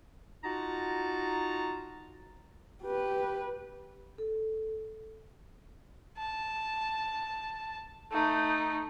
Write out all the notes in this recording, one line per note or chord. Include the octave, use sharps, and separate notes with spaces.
D#4 F4 F#4 A5 A#5
G4 B4
A4
A5
A3 D#4